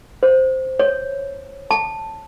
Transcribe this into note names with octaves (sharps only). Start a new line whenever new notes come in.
C5
C#5
A5